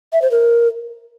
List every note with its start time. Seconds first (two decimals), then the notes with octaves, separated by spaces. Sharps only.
0.13 E5
0.22 C5
0.31 A#4